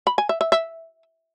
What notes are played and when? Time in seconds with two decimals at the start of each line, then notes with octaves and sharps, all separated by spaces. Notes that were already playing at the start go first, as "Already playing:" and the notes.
0.07 B5
0.18 G#5
0.29 E5
0.41 E5
0.52 E5